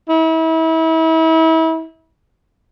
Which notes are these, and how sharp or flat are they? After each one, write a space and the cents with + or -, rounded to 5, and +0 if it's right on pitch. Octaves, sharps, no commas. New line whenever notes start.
E4 -35